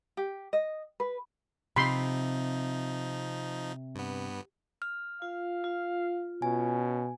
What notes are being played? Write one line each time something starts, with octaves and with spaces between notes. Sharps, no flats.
G4
D#5
B4
C3 F3 D#4 B5 C6
G2 B3
F6
F4 F5
F4
B2 C#4 G#5